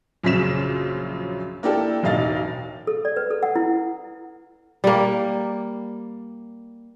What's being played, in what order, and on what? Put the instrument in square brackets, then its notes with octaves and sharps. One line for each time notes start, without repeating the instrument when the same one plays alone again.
[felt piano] A#1 F#2 C#3 B6 E7
A#3 D4 E4 G4 A4
E1 A1 D#4 F5 A6
[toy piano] A4
D5
B4
A4
F#5
E4
[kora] G3 A#3